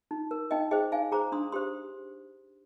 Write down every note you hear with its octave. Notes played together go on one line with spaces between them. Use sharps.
D#4
A#4
D#4 D#5 G5
G#4 C5 D#5 G5
D#4 F5 G#5
G#4 C5 A#5 D6
D4 C6 D#6
G4 C5 C6 D#6